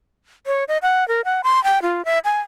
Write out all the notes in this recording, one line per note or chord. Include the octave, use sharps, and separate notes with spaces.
C#5
D#5
F#5
A#4
F#5
C6
G5
F4
E5
G#5